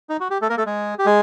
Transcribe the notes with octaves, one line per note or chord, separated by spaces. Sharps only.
D#4
F#4
G4
A3 A4
A#3 A#4
A3 A4
G#3 G#4
G4
G#3 G#4